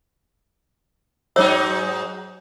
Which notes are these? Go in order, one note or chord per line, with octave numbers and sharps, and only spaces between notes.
G#2 F#3 D#4 C#5 E6